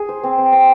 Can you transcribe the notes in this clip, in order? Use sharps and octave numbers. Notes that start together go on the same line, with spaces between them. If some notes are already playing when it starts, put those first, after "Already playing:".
Already playing: G#4
C5
C4
C4
C4